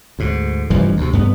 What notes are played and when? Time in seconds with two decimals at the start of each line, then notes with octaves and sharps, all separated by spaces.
0.19 D2 G#2
0.70 F1 G2 E3 F3
0.97 D2 C3
1.13 G2 B3